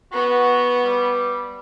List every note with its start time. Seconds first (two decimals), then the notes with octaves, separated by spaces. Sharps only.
0.12 B3 F#4
0.85 G3